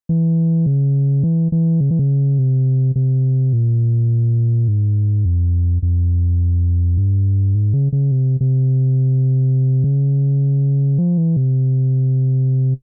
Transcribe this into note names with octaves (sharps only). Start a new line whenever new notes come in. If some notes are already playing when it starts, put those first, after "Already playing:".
E3
C#3
E3
E3
C#3
E3
C#3
C3
C3
A#2
G#2
F2
F2
G2
G#2
C#3
C#3
C3
C3
C#3
F3
E3
C3